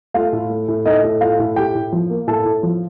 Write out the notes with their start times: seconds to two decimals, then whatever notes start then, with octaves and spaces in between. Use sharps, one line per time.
0.14 A3 F4 F5
0.33 A2
0.50 A3
0.68 A2
0.85 A3 D#4 D#5
1.04 A2
1.21 A3 F4 F5
1.39 A2
1.56 A2 G4 G5
1.75 A2
1.92 F3
2.10 A#3
2.27 A2 A4 A5
2.45 A2
2.63 F3